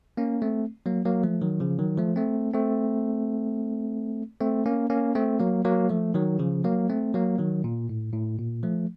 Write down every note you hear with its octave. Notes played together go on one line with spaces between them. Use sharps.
A#3 C#4
A3 C4
F#3 A#3
F#3 A#3
F3 A3
D#3 F#3
C#3 F3
D#3 F#3
F3 A3
A3 C4
A3 C4
A3 C4
A#3 C#4
A#3 C#4
A3 C4
F#3 A#3
F#3 A#3
F3 A3
D#3 F#3
C#3 F3
F#3 A#3
A3 C4
F#3 A#3
D#3 F#3
A#2
A2
A2
A#2
F3 A3